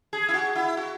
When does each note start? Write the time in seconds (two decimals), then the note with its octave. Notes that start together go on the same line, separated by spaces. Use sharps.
0.13 G#4
0.29 E4
0.33 F#4
0.56 E4
0.77 F#4